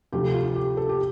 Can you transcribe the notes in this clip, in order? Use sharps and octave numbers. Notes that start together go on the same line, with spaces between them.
D2 C3 F3 A3 G4
F4
G4
A4
G4